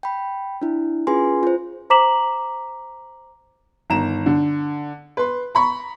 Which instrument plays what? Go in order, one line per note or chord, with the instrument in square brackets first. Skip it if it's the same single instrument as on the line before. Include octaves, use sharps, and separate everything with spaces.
[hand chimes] G5 B5
D4 E4
C#4 F4 G#4 B4 G#5 C6
F4 C5
[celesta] C5 A#5 D6 B6 E7 F#7
[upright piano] G1 D#3 A#5 E7
D3
B4 C6
A#5 B5 C#6